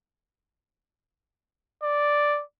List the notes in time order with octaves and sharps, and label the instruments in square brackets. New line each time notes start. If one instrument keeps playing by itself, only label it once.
[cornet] D5